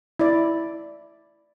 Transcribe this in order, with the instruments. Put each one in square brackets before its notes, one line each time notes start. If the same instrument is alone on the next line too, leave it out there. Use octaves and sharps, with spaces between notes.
[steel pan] E4 D5